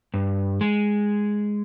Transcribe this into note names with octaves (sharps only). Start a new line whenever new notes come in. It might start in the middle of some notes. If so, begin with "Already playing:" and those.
G2
G#3